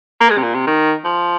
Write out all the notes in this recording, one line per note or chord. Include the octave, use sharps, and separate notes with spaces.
A#3
G#3
C3
A#2
C3
D#3
F3